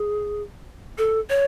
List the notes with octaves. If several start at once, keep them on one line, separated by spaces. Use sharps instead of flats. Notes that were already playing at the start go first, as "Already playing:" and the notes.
Already playing: G#4
A4
C#5